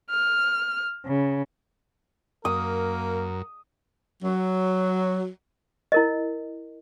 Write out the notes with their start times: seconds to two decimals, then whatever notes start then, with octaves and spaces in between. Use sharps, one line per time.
0.10 F6
1.06 C#3
2.45 F#2 A#3 A#4 D#6
4.23 F#3
5.92 E4 A#4 D#5